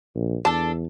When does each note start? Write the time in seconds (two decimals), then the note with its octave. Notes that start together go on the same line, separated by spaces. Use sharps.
0.15 A#1
0.45 E2 D4 A4 A5